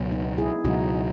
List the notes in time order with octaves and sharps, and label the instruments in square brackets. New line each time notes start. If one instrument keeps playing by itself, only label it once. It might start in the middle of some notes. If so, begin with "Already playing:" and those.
Already playing: [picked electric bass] C#2 B2 F#3
[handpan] B3 D#4
E4 G#4
[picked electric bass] C#2 B2 F#3 [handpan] D#4 F#4